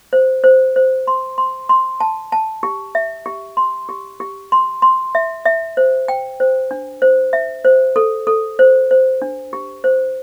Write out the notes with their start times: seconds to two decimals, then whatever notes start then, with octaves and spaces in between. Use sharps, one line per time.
0.13 C5
0.44 C5
0.76 C5
1.07 C6
1.38 C6
1.69 C6
2.00 A5
2.32 A5
2.63 G4
2.95 E5
3.26 G4
3.57 C6
3.89 G4
4.20 G4
4.52 C6
4.82 C6
5.15 E5
5.45 E5
5.77 C5
6.08 G5
6.40 C5
6.71 D4
7.02 C5
7.33 E5
7.65 C5
7.96 A4
8.27 A4
8.59 C5
8.91 C5
9.22 D4
9.53 G4
9.84 C5